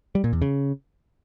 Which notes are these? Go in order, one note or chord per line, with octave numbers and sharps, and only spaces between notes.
G3
A#2
E2
C#3